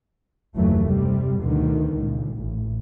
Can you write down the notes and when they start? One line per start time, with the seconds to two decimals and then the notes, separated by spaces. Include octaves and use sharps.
0.55 F#1 D#2 E3 F#3 A3
0.85 C3 G3
1.41 D2 B2 D3 D#3
1.97 C#2 A#2
2.37 A1